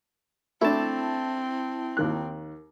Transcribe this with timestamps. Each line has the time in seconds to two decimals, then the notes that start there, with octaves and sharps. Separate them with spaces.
0.61 A3 C4 D4 E4 A5
1.97 D#2 D#3 F#6